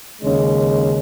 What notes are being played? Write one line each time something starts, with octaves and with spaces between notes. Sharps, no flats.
D#2 C#3 G#3 C#4